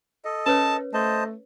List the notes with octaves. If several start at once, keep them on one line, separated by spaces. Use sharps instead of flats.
A4 D#5
C#4 A#4 B4 C#5 A5
A3 C5 D#5 A5